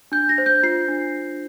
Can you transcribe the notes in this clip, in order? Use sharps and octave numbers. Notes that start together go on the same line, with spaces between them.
D4 G6
A#6
C5
G6
F4 C7
D4